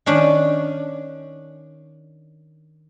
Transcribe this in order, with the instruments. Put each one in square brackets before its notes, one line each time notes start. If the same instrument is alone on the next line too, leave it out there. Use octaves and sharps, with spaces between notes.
[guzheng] D#3 C#4 D4